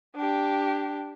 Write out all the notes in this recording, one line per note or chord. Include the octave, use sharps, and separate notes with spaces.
D4 G4